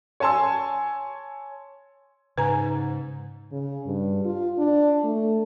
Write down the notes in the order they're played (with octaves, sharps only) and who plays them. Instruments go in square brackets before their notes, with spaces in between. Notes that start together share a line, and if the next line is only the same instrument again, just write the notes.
[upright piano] C#5 G#5 A5 C6 E6
[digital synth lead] G#2 [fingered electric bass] C#3 [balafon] B4 G#5 A#5
[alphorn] C#3
G2
F4
D4
A3